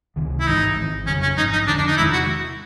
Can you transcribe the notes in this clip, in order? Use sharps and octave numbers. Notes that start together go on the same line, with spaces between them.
C#2 C3 D#3
E4
A1 G#2 E3 G#3 D#4
G#1 G#2 D#3
F2 C#3 F#3 C#4
C#4
A1 G#2 F3 D#4
D#4
F2 D3 F3 D4
D4
D#4
E2 C3 D#3 G#3 E4
F#4